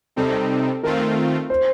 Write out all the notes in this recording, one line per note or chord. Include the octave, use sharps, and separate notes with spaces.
C3 G3 C4 D#4 A4
D#3 A3 C4 F4 A#4
C5